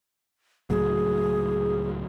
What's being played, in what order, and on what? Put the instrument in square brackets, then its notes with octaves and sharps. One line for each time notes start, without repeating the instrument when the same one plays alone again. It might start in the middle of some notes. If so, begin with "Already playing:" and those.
[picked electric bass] C#2 A2 F#3 [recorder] G#4